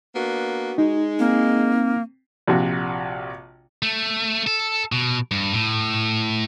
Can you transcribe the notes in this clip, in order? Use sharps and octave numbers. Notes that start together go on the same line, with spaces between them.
A#3 B3 D4 F#4
G#3 D#4
A#3 C4
A#1 C3 F#4
A3
A4
B2
G2
A2